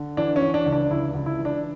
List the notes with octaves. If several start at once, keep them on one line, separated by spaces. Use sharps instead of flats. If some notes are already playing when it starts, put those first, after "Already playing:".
Already playing: D3
E3 D4
C#4
E3
D4
C#2
D4
C#2 E4
C#2
E4
E3
D4